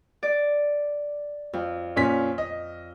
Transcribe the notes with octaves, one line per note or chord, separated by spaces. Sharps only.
D5
F2
A#2 C#4 B6
D#5